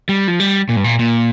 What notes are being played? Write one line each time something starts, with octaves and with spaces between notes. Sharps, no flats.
G3
F3
G3
A#2
G2
A#2
A#2